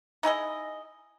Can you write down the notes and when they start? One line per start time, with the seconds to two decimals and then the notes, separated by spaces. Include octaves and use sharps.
0.23 D#4 E4 G#4 D#5